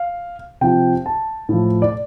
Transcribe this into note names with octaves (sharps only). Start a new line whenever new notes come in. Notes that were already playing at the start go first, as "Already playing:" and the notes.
Already playing: F5
C3 F3 G5
A5
A2 F3
D5